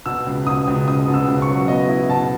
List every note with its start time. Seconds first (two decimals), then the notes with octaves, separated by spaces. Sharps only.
0.06 B2 E6
0.27 C#2
0.47 B2 D#6
0.68 C#2
0.88 C#2 D#6
1.08 B2
1.14 E6
1.28 C#2
1.42 C#6
1.49 F#3
1.68 B3 D#5
1.89 E4
2.09 B2 A5